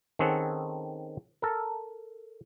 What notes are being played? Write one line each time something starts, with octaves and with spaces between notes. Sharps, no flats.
D#3 C4 C#4 G#4 A4 F#5
A4 A#4